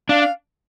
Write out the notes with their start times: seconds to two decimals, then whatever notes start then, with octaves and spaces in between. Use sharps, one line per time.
0.09 D4 F5
0.21 F5